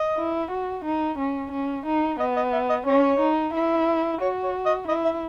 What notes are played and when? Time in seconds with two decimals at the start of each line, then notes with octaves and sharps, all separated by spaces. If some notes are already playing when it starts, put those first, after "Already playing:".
Already playing: D#5
0.18 E4
0.51 F#4
0.85 D#4
1.18 C#4
1.52 C#4
1.86 D#4
2.20 B3 D#5
2.37 D#5
2.53 E5
2.70 D#5
2.87 C#4 C#5
3.20 D#4
3.54 E4
4.21 F#4 C#5
4.44 C#5
4.66 D#5
4.88 E4 D#5
5.05 E5